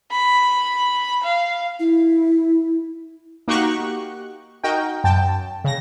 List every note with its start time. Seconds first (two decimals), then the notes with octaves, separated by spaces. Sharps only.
0.11 B5
1.23 F5
1.80 E4
3.48 A#3 D#4 F#4 G4 C#6 F#6
4.64 D#4 F#4 A#4 G5
5.04 F#2 G5 A5
5.64 C#3 A#6